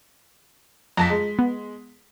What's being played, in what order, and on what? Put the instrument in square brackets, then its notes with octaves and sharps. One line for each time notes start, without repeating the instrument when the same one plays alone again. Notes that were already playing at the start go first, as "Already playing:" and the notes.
[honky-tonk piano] F2 A5 B6 [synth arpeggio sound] A#5 A#6
[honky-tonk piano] G#3
[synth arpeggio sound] B3